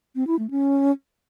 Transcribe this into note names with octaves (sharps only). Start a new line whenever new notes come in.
C4
E4
A3
C#4